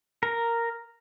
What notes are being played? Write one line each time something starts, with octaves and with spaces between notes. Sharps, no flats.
A#4